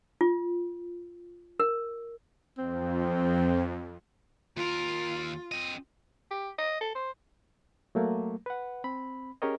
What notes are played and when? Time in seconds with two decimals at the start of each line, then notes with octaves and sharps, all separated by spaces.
0.21 F4
1.60 A#4
2.58 F2 C4
4.57 D#2 F4 A#4
5.52 C4 D#5
6.31 G4
6.58 D#5
6.81 A4
6.95 C5
7.95 F#3 A3 A#3
8.46 B4 F#5
8.84 C4 B5
9.42 C#4 G4 G#4 A#4 C#5 D#5